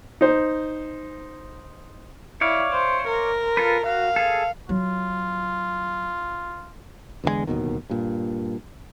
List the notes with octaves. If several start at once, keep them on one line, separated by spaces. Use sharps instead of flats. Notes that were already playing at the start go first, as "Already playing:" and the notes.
D#4 C5
E4 C#5 D5 F5
C5
A#4
F4 A4 B4
F#4 F5
G#4 A4
F#3 F4
E2 D3 D#3 G#3
D1 D#2 B2 D#3
G2 A#2